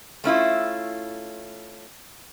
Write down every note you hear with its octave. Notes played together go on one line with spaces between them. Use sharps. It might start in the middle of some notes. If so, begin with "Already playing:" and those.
A3 C#4 E4 F4